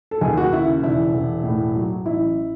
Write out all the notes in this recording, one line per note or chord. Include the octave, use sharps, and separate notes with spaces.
A4
D#2 G#4
F#4
C#3 E4
E1 E4
E1
A2
F#3
A1 E4